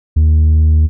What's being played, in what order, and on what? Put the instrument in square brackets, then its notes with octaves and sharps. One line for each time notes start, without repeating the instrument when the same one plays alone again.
[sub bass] D#2